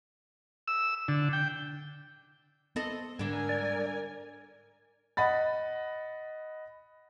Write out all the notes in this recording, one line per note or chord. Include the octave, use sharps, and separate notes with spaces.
E6
D3
G5
B3 C4 A4 D#5
G#2 D3 G3 D4 A#4 G#5
D5
D#5 F#5 B5 A6